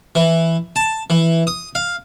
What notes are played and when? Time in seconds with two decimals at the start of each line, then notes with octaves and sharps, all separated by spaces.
0.15 E3
0.76 A5
1.10 E3
1.47 D#6
1.75 F5